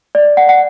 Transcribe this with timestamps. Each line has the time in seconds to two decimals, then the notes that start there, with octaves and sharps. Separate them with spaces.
0.15 D5
0.37 F#5
0.49 F#5